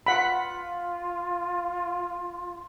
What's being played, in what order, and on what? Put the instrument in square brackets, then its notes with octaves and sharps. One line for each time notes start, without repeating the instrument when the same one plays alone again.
[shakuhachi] F4 [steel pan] F#5 B5